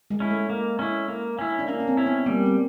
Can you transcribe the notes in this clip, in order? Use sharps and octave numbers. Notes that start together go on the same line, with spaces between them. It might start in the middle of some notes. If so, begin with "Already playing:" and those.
G#3
C#4 E4
A3
A#3
C#4 E4
A#3
C#4 E4
D4
A#3 C#4
C#4
C4
C#4 E4
B3
G3 A#3
C4